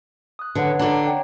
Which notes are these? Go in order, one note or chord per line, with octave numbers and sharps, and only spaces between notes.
D#6 F#6
D3 B4 C#5 F#5
D3 D4 F#5 A#5 D6
C#5 G5